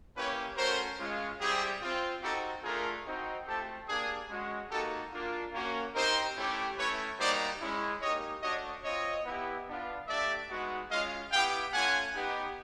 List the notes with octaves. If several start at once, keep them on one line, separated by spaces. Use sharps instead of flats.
A#3 C#4 E4 G4 B4 C#5
A3 C#4 F#4 A#4 C5
G#3 C#4 F4
G3 C4 E4 G4 G#4
C4 F4
C4 D#4 F#4 G4 A4
A3 D4 F4 G#4 A#4
C4 D#4 F#4
A3 C4 F4 G4 A4
A#3 D4 G4 G#4
G#3 C#4 F#4
A#3 D#4 F#4 G4 A4
A#3 D4 F4
A#3 C#4 F#4
C4 D#4 G4 A#4 C5
A3 C#4 E4 G4
A3 C#4 E4 B4 C#5
G3 A#3 D#4 F#4 C5 D5
G#3 C#4 E4
A#3 D#4 G4 C#5 D#5
A3 D4 F#4 C#5 D#5
C4 F4 C#5 D#5
B3 E4 G4
B3 D4 F4
A3 D4 G4 D5 E5
G#3 B3 D#4 F#4
G#3 C#4 F4 D#5 F5
B3 E4 G4 F5 G5
A3 C#4 F4 F#5 G#5
B3 D#4 G4